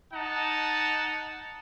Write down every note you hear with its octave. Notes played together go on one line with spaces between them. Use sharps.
D#4 F#5 A5